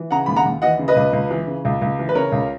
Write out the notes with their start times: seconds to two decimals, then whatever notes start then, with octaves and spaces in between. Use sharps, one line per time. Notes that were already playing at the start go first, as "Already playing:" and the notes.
Already playing: E3
0.11 C#3 F#5 A#5
0.26 D#2 B5
0.36 F#5 A#5
0.45 D#2
0.62 E3 D#5 F#5
0.79 C#3
0.88 B4 D#5
0.96 C#2
1.13 C#2
1.31 E3
1.47 C#3
1.65 C#2
1.82 C#2
1.99 E3
2.09 B4
2.15 C#3 A#4 C#5
2.32 C#2